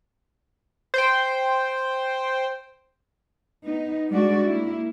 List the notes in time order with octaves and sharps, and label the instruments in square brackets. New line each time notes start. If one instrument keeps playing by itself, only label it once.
[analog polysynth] C5 G5
[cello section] B3 D#4
G3 G#3 D4 F#4 D5
A#3 E4